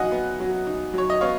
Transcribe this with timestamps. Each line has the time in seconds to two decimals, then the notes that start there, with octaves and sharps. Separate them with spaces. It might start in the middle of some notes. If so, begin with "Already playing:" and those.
Already playing: F#3 D#4 D#5 F5 F#5 G#5
0.12 B3
0.40 F#3
0.67 D#4
0.93 F#3 C#5
1.10 D#5
1.21 B3 C#5 F5